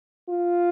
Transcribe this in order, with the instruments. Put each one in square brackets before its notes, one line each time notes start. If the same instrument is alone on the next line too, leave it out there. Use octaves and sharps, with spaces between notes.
[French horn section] F4